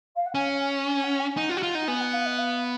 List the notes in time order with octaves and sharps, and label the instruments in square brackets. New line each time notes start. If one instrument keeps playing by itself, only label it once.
[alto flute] F5
F#5
[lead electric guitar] C#4 [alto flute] G#5
[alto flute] G#5
F#5
G#5
[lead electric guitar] D#4 [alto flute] F#5
[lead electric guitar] F4
F#4
F4
D#4
[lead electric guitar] B3 [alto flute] G#5
[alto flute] F#5
F5
D#5
F5